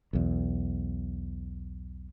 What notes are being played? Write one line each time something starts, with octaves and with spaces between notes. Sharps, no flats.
B1 E2